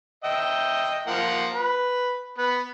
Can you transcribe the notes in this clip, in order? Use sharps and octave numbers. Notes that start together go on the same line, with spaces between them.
D#5 E5 G5
F3 A#3 F#5
B4
B3 B4